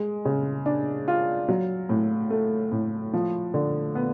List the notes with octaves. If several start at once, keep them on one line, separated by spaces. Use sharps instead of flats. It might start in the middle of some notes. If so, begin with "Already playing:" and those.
Already playing: G#3
C#3
D4
F4
F#3
A2
A3
A2
F3
D3
B3